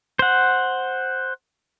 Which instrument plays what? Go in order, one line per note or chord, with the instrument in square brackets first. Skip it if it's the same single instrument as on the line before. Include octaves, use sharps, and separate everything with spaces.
[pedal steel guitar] C5 F#5